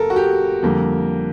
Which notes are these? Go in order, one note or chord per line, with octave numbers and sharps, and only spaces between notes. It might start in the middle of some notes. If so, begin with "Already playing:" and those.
Already playing: F#1 A4 A#4
F#4
G4
F2 D3 G3 A#3